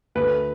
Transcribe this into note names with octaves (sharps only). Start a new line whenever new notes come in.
D2 B4